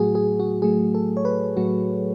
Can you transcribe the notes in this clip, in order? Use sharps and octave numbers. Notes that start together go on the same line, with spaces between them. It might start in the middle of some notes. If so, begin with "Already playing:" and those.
Already playing: A2 F#3 A3 F#4 G#4
G#4
F#4
A2 F#3 A3 G#4
A4
C#5
B4
A2 F#3 A3 F#4